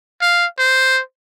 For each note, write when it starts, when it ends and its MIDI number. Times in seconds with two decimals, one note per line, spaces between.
0.21 0.45 77
0.59 1.00 72